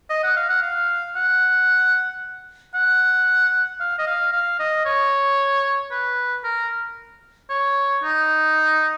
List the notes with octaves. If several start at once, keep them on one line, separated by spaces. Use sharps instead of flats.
D#5
F#5
F5
F#5
F5
F#5
F#5
F5
D#5
F5
F5
D#5
C#5
B4
A#4
C#5
D#4